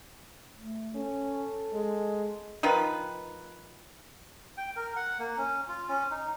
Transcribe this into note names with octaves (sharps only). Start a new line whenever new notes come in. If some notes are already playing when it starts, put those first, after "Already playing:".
A3
C#4 A4
G#3
D#3 F3 D#4 B4
G5
A#4
F#5
A#3
C#4
F4
C#4
D#4